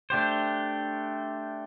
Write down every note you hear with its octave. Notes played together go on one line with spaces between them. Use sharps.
A3 D4 G4 C5